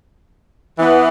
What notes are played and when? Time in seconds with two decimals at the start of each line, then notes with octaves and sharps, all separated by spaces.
0.79 E3 B3